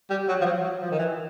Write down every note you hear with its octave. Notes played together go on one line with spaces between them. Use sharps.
G3
F#3
F3
F#3
F#3
F3
D#3
E3